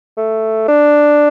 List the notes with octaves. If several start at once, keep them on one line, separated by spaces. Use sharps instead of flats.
A3
D4